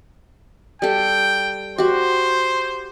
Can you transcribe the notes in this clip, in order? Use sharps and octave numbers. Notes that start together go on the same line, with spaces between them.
G3 A4 G5
F#4 G4 C5